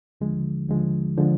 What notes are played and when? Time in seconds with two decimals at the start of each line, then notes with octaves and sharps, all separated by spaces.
0.21 D#2 D3 F3 G#3
0.69 D#2 D3 F3 G#3
1.17 D3 F3 G#3